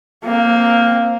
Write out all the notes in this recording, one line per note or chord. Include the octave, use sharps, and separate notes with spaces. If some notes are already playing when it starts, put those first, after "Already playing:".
A#3 C4